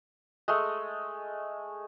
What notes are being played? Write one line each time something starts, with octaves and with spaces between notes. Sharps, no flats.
G#3 A3